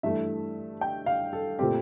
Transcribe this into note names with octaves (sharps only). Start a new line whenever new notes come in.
G2 E3 A3 E5
G5
F5
A4
A#2 A3 C4 G4